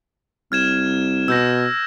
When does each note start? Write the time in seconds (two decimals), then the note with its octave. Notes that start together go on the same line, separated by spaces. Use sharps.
0.52 C2 F6 G#6 E7
1.28 B2 E6 G6 A#6